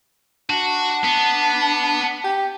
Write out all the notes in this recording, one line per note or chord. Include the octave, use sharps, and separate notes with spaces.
D4 F#4
B3
G4